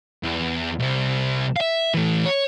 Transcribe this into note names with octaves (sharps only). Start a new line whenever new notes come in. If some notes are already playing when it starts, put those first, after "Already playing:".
E2
C2 C3
E5 F5
E3 A3
C#5